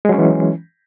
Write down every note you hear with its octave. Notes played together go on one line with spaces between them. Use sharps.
E3 F#3 G#3 C#4